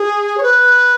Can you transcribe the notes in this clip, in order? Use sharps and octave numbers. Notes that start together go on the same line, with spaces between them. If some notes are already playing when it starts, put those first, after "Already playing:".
Already playing: G#4
C#5
B4